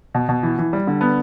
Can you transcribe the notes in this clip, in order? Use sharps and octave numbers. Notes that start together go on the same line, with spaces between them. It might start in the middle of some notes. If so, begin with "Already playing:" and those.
B2
B2
E3
E3
G3
D3
B3